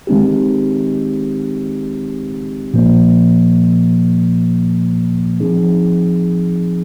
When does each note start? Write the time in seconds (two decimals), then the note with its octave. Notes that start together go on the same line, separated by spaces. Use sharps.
0.07 D#3 G#3 C4 D#4 G4
2.74 A#2 F3 A#3
5.40 F3 C4 D#4 G#4